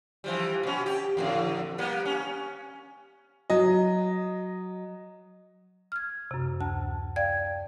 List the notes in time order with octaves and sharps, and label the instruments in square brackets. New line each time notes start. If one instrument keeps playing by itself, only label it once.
[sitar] E3 F3 G3
B2 C#4
G4
E2 A2 D3
G3 A#3 B3
C#4
[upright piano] F#3 D#5
[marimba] F6 G#6
F#2 C3
D2 A5
D5 F5 G5 G#6